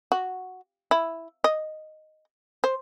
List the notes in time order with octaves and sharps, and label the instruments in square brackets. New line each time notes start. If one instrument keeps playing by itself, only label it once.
[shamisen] F#4
E4
D#5
C5